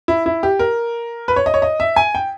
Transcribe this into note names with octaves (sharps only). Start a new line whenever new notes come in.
E4
E4
G4
A#4
B4
C#5
D#5
C#5
D#5
E5
G#5
G5